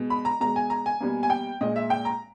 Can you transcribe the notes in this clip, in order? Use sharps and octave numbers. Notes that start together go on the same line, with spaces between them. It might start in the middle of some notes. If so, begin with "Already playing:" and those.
Already playing: B2 G#3
B5
A#5
B2 G#3 A#5
G#5
A#5
G#5
B2 G3 A#3
G#5
G5
A#2 G#3 D#5
E5
G5
A#5